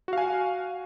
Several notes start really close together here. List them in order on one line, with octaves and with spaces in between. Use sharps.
F#4 F5 G#5